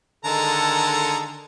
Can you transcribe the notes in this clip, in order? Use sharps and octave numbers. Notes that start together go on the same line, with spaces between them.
D3 D#3 G#3 A4 A5 A#5